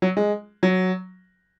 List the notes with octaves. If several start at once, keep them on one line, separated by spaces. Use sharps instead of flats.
F#3
G#3
F#3